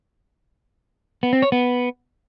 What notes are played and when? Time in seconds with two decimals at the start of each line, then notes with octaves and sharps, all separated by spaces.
1.23 B3
1.33 C4
1.42 C#5
1.52 B3